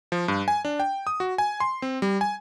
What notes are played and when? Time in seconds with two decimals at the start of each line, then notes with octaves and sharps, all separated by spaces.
0.12 F3
0.28 G2
0.48 G#5
0.65 D4
0.80 G5
1.07 D#6
1.20 F#4
1.38 G#5
1.60 C6
1.82 C4
2.02 G3
2.21 G#5